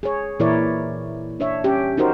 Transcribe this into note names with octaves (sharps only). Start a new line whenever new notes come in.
G#4 C#5
A#2 E3 E4 A#4 C#5 D5
D4 C#5 E5
C#4 G4
D#4 F#4 A#4 C5